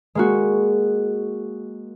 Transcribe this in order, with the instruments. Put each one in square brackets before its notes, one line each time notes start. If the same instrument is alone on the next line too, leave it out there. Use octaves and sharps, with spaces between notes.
[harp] G#3 A#3 F#4